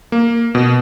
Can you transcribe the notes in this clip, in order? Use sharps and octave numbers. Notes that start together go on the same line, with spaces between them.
A#3
B2